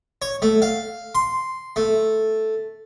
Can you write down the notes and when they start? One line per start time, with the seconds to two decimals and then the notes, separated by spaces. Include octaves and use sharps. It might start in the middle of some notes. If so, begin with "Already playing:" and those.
0.22 C#5
0.42 A3
0.62 F5
1.15 C6
1.76 A3